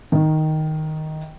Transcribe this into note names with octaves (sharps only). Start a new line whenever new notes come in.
D#3